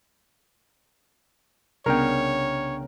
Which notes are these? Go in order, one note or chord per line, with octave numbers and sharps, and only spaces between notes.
C2 C#3 B3 C#4 D4 A#4 C#5 G5